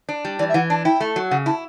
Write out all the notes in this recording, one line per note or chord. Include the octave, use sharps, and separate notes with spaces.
D4
G3
E3 D5
E5
E3 F#5
D4 A5
E4 G5
A3
F#3
C#3 F#5
E4 A5